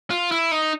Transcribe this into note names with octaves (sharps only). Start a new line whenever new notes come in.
F4
E4
D#4